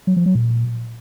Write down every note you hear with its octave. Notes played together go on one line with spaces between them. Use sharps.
F#3
F3
F#3
A#2